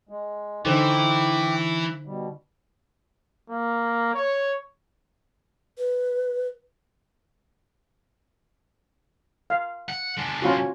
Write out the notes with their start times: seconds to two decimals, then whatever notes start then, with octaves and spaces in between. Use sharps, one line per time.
0.09 G#3
0.65 D3 E3 D#4 E4 C5 G5 C#6 D6
2.05 B2 G3
3.50 A#3
4.15 C#5
5.78 B4
9.50 F5
9.89 F#5
10.17 G#3 D4
10.42 C#4 F4 F#4